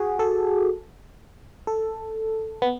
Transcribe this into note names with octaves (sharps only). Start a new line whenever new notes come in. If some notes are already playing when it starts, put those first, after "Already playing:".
Already playing: F#4 G#4
A4
A4
B3